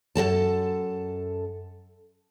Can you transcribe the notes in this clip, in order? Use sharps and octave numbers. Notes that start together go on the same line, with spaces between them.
F#2 B2 A4 A5